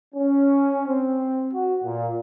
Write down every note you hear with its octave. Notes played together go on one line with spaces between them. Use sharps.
C#4
C4
F#4
A#2